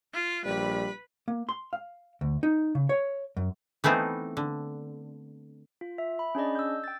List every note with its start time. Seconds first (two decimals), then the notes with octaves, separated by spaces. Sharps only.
0.13 F4
0.45 A#1 G3 B4 B5
1.28 A#3
1.49 C6
1.73 F5
2.21 D2
2.43 D#4
2.75 C#3
2.89 C#5
3.37 F#2
3.84 E3 A3 B3 C4 D#4
4.37 D3
5.81 F4
5.98 E5
6.19 B5
6.35 C#4 D4 G#4 D5 D#5
6.55 E6 G6
6.84 G5 A6